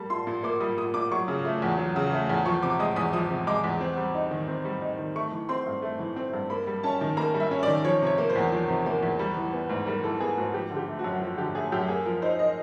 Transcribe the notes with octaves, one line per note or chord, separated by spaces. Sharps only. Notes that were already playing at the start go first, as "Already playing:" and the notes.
Already playing: G3 A#3 A5
A#2 C6
A#2
A#3 D6
G3 D#6
A#2 D#6
A#2 D6
F#3 C#6
C#3
A3
E2
F#3
C#3
A3
E2
F3 C#6
C3 D6
G#3 D#6
E2 D#6
F3 D#6
C3
G#3 D6
E2
C4
G3
D#4
D#3
C4
G3
D#4
D#3
A3 C#6
E3
C4 C6
G2
A3
E3
C4
G2
A#3 B5
G3
C#4 A5
D#3
A#3 A#5
G3
E5
C#4
D#3 D5
F3 C#5
C3 C#5
A#3
C5
E2
F3
C3
A#3
E2
G3
E3
B3
G#2
G3 A#4
E3 A4
B3 G#4
G#2 F#4
F3 G4
D3
G4
A3
F#4
F#2
F3 F#4
D3 G4
A3 G#4
F#2 G4
A#3 G#4
F3 A#4
D#4 C5
D#5